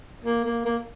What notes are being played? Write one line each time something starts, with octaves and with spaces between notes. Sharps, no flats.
A#3
A#3
A#3